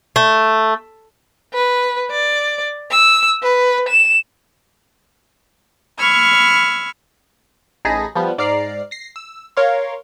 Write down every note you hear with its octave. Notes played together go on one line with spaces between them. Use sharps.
A3
B4
D5
E6
B4
E7
B5 C#6 E6 F6 G#6
A1 D#4 G#4 A5 B5 A#6
F3 G3 B3
G#2 D5 A#5 F6 C7
A#6 C7
E6
A#4 C#5 F5 C6